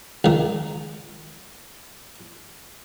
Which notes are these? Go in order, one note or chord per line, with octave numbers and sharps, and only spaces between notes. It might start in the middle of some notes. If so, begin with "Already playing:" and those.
C#2 D#3